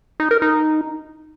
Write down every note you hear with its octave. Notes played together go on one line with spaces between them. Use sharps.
D#4
A#4
D#4